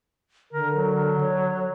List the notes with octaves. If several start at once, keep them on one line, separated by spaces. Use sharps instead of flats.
D3 A#4
F#3
C#5